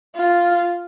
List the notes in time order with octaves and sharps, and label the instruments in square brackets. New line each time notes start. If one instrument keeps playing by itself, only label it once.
[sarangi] F4